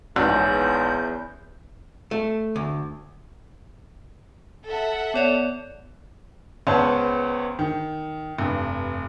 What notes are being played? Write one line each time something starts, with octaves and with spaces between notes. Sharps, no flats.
A#1 E2 G#2 C#4 G6
A3
D2
A4 E5 F#5
B3 C#5 D5
C#2 B3 C#4 C5 F#5 A5
D#3
F1 G2